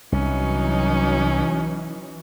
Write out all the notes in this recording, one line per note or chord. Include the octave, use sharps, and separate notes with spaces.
C2 E3 F#3 C#4 D#4